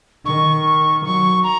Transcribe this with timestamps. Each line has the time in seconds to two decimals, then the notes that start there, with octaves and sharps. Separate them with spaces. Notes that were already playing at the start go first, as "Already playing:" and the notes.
0.25 D#3 C#6
1.04 F#3 C#6
1.44 A#5